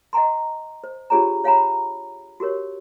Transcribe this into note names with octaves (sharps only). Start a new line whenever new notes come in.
D#5 F#5 G#5 A#5 C6
C5
D4 F4 G4 G#4 C#5 A#5
C#5 F5 F#5 G#5 A#5 B5
F#4 G4 A#4 C#5